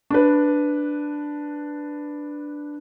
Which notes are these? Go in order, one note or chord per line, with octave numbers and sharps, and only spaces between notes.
D4 B4